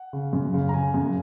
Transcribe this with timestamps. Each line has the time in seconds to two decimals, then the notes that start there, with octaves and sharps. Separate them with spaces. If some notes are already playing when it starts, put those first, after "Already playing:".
Already playing: F#5
0.13 C#3
0.33 F#2
0.54 C#3
0.69 A#5
0.74 C#3 G#5
0.94 F#2